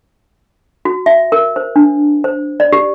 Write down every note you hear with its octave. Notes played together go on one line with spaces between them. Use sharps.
F#4
E5
A#4
C5
D4
C5
D5
G4